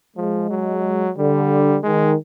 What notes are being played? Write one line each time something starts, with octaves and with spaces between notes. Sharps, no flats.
F3 G#3
F#3
D3 G3
D#3 G#3